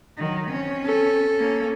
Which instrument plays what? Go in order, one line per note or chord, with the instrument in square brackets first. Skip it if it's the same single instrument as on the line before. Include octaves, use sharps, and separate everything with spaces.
[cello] D#3 F#3
C4 C#4
[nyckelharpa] A4
[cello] A#3 C#4